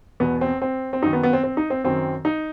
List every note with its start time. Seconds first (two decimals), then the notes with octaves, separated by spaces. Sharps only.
0.20 E2 B2 B3
0.41 C4
0.62 C4
0.93 C4
1.02 F#2 D#4
1.06 D#3
1.13 B3
1.23 B3
1.33 C4
1.44 C4
1.57 D#4
1.70 C4
1.84 F#2 D#3 C4
2.25 D#4